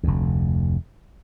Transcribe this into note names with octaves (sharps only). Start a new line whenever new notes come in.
F1 D2